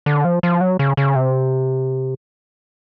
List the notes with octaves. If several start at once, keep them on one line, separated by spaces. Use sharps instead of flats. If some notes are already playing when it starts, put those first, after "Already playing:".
D3
F3
F3
F#3
C#3
C#3
C3